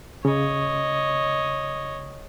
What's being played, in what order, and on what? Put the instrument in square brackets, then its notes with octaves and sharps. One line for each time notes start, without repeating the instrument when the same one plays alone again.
[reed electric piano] C#3 [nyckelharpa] C#5 D#5